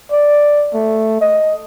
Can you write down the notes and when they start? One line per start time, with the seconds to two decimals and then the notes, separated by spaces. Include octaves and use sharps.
0.12 D5
0.74 A3
1.21 D#5